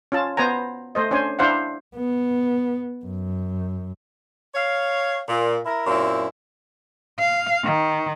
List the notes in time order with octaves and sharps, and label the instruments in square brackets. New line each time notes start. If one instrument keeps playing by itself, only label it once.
[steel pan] C#4 F4 A5
B3 C5 G#5 A#5
A3 C5 D#5
C#4 D4 C5 G#5
D4 E4 C5 F5 F#5
[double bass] B3
F#2
[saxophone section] C#5 F5
A#2
E4 A#4
F#2 A#2 C4 E4
[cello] F5
D#3